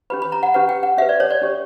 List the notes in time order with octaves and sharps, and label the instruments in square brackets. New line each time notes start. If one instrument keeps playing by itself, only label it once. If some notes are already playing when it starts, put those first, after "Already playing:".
[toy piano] C#4 G4 B4 B5
B5
A#5
F#5
C#4 G4 B4 F#5
G5
F#5
C#4 G4 B4 E5
D5
C#5
D5
C#4 G4 C#5